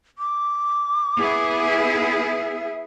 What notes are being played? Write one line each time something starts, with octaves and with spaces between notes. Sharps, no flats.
D6
B3 E4 G#4
E5